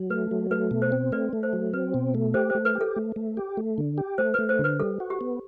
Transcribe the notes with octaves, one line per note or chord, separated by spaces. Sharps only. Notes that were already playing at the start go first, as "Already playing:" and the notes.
Already playing: F#3
A3 B4
F#3
A3 B4
B2
C5
C4
A3 B4 D5
A3
C5
F#3
C4 B4
B2
A3
G4 C5
A3 C5
B4
G4
A4
A3
A3
G4
A3
D3
G4
A3 C5
A3 B4
C5
D3
B4
G3 A4
F#4
G4
B3